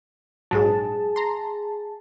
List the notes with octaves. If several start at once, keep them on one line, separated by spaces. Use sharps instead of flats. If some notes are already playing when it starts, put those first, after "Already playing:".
A#1 G#2 F#3 G#4 A5
A#5 C6